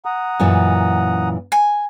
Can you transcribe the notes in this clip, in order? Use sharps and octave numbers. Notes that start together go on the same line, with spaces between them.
F#5 A#5 D#6
F#2 A#2 E3
G#5